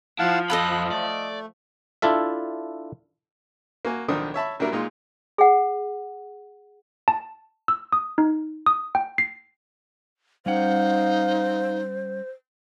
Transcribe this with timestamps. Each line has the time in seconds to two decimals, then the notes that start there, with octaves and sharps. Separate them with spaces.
0.19 F3 E4 F5 F#5 A5
0.50 F2 F4 A4 D#5 B5 F#6
0.91 A3 D5
2.02 D4 E4 F4 A4 E5
3.85 A#3 F#4 G#5
4.08 B1 D#3 F3 D4 D#4 D#6
4.34 C#5 E5 A5 B5
4.60 A#2 F#3 G3 D4 E4 A#4
4.72 A#2 G#3 D#4 F4
5.38 G#4 F#5
7.08 A5
7.68 E6
7.92 D#6
8.18 D#4
8.66 D#6
8.95 G5
9.18 C7
10.46 G3 C#4 D#4 C5 F5 F#5